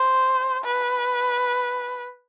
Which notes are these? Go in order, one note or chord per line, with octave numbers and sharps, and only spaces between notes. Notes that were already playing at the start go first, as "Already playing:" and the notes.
Already playing: C5
B4